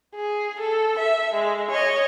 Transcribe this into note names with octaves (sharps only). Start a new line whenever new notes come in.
G#4
A4
E5
G#3
C#5 D#5